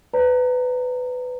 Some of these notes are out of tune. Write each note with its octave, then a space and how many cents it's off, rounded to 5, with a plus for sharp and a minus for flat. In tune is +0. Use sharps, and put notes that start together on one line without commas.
B4 +20 D5 -45 A#5 -20